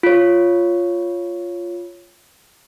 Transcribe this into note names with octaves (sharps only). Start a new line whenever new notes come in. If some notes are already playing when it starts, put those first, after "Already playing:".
F4 C#5